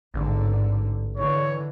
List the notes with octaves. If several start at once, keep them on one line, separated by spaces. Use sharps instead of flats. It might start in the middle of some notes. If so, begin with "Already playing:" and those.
A1 G#2 D3
D3 E3 C#5